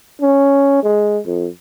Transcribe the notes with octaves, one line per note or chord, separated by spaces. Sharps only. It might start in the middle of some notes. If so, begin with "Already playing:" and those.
C#4
G#3
F2